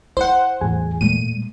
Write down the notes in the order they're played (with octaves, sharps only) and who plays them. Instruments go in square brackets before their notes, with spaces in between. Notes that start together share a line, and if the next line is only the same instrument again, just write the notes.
[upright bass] E4 [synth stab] C5 F#5
[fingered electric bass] E2 A2 [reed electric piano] G#4 G#5
[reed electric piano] A#2 [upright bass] G3 A3 [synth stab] D#7